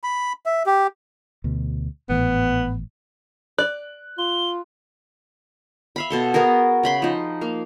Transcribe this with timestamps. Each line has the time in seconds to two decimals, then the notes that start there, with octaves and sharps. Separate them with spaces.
0.03 B5
0.46 E5
0.66 G4
1.44 D2 B2
2.09 G#1 A2 E3 B3
3.58 D5 F#6
4.18 F4 G7
5.96 E5 F5 B5
6.10 B2 A4 C6
6.34 B3 F#4 G#4 A#4
6.83 C#3 B5 C6
7.02 F3 D#4
7.41 A#3 F5